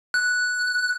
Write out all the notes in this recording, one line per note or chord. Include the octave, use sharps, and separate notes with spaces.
F#6